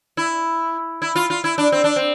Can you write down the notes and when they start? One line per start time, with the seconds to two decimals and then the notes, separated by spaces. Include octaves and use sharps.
0.17 E4
1.02 E4
1.16 F4
1.30 F4
1.44 E4
1.58 D4
1.72 C4
1.84 D4
1.96 C4